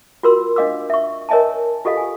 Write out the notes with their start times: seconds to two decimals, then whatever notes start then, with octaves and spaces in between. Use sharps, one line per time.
0.23 F4 F#4 A#4 C6 E6
0.56 D4 D#5 F5 D6 E6
0.90 E5 C#6
1.29 A#4 C#5 D#5 E5 G#5 A5
1.85 F4 G4 A4 D#5 F5
1.97 G#5